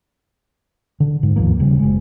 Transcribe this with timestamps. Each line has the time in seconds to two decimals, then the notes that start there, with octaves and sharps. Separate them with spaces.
1.00 D3
1.23 G#2
1.36 D#2 F3 A#3
1.60 D#1 C#3 G3
1.79 F#1 G#3